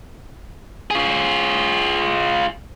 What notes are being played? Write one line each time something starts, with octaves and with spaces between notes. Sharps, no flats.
F4 G#4